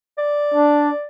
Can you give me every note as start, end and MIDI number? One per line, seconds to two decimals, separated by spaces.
0.18 1.07 74
0.54 0.90 62